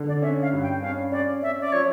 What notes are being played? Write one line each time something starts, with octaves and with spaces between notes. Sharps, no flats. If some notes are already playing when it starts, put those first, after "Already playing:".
Already playing: D3
D5
C#4 E5
F5
G2
G5
C#4 F5
C#4 D5
C#4 E5
D5
F3 C#5